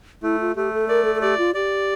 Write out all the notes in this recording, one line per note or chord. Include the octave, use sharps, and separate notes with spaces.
A3 E4
F4
A3 G4
A4
A#4 D5
A4
A4
G4 D5
F4
G4 D5